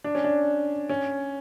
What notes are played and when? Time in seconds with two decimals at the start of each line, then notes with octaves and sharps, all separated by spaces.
0.04 D4
0.15 C#4
0.24 D4
0.89 C#4